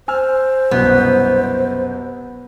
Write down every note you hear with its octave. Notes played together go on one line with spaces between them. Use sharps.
C5 G#5 E6 F6
C2 F#2 B2 B3